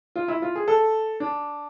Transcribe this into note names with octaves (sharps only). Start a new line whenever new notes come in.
F4
E4
F4
G#4
A4
D4